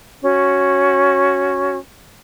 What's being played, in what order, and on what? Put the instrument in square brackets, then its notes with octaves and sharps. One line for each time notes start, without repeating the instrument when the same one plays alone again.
[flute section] C#4 F#4